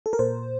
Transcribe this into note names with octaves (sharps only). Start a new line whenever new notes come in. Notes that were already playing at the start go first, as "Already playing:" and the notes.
A4
A#4
A#2 C5